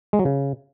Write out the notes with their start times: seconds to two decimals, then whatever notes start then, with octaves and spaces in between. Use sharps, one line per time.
0.13 G#3
0.19 F#3
0.25 C#3